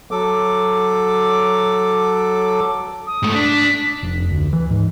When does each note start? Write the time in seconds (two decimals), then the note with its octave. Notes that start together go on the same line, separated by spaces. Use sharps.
0.11 F#3 A4 D6
3.07 D#6
3.23 G#2 A3
3.35 D4 B6
4.03 F1
4.31 D2
4.53 E3
4.70 G#2